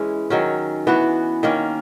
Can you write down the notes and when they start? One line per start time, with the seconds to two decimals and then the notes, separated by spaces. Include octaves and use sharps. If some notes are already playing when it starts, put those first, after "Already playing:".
Already playing: E3 G#3 C#4 E4
0.30 D#3 F#3 C#4
0.87 E3 B3 F#4
1.43 D#3 A#3 C#4